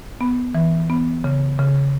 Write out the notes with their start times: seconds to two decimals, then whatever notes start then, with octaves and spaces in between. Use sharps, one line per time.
0.21 B3
0.54 E3
0.90 B3
1.24 C#3
1.59 C#3